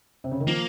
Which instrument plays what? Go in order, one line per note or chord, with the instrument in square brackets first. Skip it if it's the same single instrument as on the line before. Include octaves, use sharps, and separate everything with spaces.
[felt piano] C3
C#3
D#3
[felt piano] F3 [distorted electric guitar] A#3